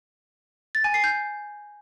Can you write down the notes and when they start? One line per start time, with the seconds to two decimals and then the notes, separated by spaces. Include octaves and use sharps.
0.75 A6
0.84 G#5
0.94 C7
1.04 G6